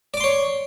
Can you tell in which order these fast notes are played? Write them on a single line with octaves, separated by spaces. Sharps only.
D5 D6 C6 C#5